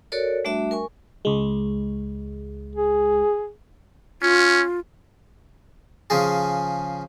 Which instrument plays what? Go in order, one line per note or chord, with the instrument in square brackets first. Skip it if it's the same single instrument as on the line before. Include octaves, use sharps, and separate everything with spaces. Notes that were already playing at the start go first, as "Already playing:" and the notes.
[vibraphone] F#4 A4 A#4 C#5 D5
G3 A3 D4 F#4 E5
A#4 G#5 C#6
[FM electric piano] C#2 G#3
[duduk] G#4
[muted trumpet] C#4 [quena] F4
[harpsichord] C#3 F3 G#4